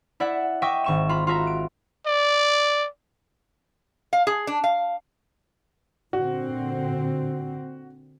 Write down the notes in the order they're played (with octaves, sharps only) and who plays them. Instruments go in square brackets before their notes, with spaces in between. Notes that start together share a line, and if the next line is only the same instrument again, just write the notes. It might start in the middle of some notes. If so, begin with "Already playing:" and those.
[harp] E4 D5 E5 F#5
D#5 E5 G5 C#6 D6
G#1 C#6 E7
F4 B5
F4 F#4 E5 A#5
D7
[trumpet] D5
[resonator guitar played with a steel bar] F5
G#4
D4
F5
[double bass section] A#2 D3 C4 [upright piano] F#4